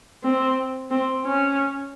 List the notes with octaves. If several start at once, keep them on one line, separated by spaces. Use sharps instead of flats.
C4
C4
C#4